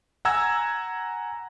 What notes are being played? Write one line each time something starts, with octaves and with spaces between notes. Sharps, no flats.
F#5 G#5 A#5 E6 G#6